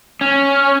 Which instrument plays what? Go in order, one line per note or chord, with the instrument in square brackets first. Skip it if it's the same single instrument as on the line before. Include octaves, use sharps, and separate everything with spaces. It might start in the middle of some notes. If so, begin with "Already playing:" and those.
[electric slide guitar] C#4